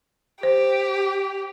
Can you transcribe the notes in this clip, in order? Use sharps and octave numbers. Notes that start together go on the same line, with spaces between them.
G4 C5